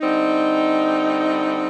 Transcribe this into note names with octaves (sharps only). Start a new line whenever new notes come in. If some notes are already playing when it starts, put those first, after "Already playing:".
D3 G3 C4 D#4